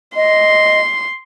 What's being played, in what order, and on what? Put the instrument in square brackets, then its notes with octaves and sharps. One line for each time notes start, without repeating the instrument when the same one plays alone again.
[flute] D#5 [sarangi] C6